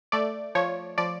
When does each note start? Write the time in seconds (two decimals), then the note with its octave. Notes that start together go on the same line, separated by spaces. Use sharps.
0.12 A3 D5
0.55 F3 C#5
0.98 F3 D5